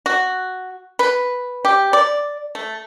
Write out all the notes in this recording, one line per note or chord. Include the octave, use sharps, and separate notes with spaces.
F#4
B4
G4
D5
A3